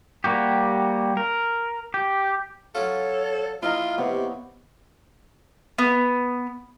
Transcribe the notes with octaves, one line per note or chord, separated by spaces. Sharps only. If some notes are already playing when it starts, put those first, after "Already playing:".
G3 A#3 F#4 G4
A#4
G4
F#3 C#4 F4 A4 C#5
F3 E4 F4 D#5 A#5 F6
C3 B3 G4 C#5
B3